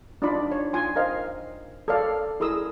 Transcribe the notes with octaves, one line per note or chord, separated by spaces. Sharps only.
D4 D#4 F4 D5 B5
C#5
F4 G#5 C6
A#4 C5 D#5 F5
A4 A#4 C#5 D5 F5
E4 G#4 A#4 D#6 E6